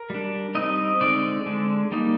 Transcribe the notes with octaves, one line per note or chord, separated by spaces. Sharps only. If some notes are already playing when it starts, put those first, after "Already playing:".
Already playing: A#4
G3 D4
G3 C4 D#4 D#5
D3 G#3 C4 D#4 D5
D3 G#3 D4
G3 A#3 D#4